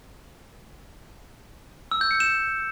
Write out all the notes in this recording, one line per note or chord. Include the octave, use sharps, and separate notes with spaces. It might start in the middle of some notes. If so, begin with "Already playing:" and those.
E6
G6
C#7
E7